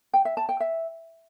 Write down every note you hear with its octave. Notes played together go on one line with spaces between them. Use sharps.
G5
E5
A5
G5
E5